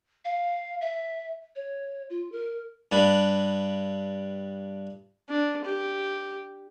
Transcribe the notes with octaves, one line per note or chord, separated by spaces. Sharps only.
F5
E5
C#5
F4
A#4
G2 G3 D4 B4
D4
G4